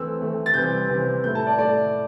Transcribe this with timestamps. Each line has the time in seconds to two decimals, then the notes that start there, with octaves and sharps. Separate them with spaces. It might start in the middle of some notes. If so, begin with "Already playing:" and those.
Already playing: E3 A3 C4 E6
0.19 E3 A3 C4
0.46 A6
0.54 C3 E3 G3 C4 G6
0.89 C3 E3 G3 C4
1.24 A2 A3 E4 G6
1.35 A5
1.47 D5
1.58 A2 A3 E4 D5